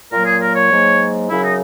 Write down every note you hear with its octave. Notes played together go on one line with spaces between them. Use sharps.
A#2 F#3 A#3 A#4
G#4
A#4
C#5
G#2 F#3 A#3
F#2 C#3 F#3 E4
D#4